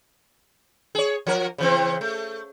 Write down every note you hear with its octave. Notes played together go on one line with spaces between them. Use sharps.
G#4 C#5
F3 A#4
C#3 E3 C4
A3